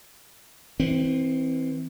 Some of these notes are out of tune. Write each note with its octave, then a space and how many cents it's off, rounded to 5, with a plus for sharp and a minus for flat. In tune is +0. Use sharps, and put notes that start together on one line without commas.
E3 -25 C4 +0